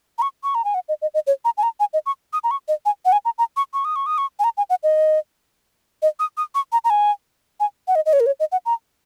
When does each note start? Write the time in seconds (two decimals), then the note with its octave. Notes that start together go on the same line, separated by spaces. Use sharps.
0.18 A#5
0.22 C#6
0.44 C#6
0.55 A#5
0.65 G#5
0.74 F#5
0.89 D#5
1.02 D#5
1.14 D#5
1.27 C#5
1.45 A#5
1.57 G#5
1.63 A#5
1.80 G#5
1.93 D#5
2.06 C#6
2.33 D#6
2.44 A#5
2.51 C#6
2.68 D#5
2.86 G#5
3.05 F#5
3.12 G#5
3.25 A#5
3.38 A#5
3.57 C#6
3.74 C#6
3.85 D#6
3.96 C#6
4.06 D#6
4.18 C#6
4.39 G#5
4.44 A#5
4.57 G#5
4.70 F#5
4.83 D#5
6.02 D#5
6.19 D#6
6.37 D#6
6.55 C#6
6.72 A#5
6.84 A#5
6.90 G#5
7.60 G#5
7.88 F#5
7.95 D#5
8.06 D#5
8.13 C#5
8.20 A#4
8.26 C#5
8.40 D#5
8.52 F#5
8.66 A#5